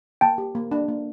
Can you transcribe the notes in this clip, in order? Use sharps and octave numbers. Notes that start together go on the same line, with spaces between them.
A#3 G5 A5
G4
A#3
D4
A#3